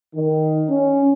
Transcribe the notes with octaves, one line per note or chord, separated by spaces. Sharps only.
D#3
C#4